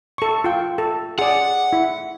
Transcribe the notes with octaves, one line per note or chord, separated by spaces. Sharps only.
A4 C#6
F4 G5
A4
G#4 D5 F#5
E4